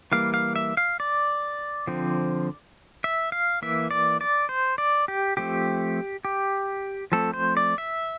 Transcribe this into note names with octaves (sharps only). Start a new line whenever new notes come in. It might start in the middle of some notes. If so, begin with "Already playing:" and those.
E3 G3 A#3 F5
F5
E5
F5
D5
D3 F3 C4
E5
F5
E3 A#3 E5
D5
D5
C5
D5
G4
F3 A3 C4 G4
G4
F3 A3 C4 A4
C5
D5
E5